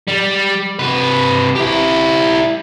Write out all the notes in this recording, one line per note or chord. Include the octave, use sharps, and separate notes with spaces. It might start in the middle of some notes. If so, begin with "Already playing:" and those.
G3
C3 B4
E4 G4